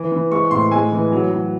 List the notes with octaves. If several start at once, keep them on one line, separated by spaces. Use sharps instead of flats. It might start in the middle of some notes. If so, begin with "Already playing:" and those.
Already playing: E3
E3
G#3 C#6
A2 C6
G#3 G#5
E3
F#3
F#3